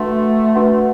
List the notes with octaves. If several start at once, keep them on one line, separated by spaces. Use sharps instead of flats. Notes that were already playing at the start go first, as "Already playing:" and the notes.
Already playing: A3 D4 F#4 B4 F#5 C6
D4 F#4 B4 F#5 C6